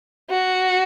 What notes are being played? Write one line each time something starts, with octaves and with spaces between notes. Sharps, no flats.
F#4